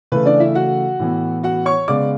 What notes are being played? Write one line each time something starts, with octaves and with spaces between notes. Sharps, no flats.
C#3 E3 A3 B4
D4 D5
E4 E5
F#4 F#5
A2 E3 B3
F#4 F#5
C#5 C#6
C#3 G#3 B3 D5 D6